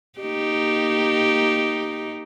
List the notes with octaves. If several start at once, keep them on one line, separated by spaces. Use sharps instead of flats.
A#3 D#4 G4